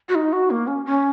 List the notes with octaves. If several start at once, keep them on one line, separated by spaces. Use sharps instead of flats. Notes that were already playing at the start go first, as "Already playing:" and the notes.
F#4
D#4
F#4
A#3
C#4
C#4